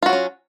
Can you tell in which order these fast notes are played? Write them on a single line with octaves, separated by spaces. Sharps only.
F4 F#4 F#3 C#4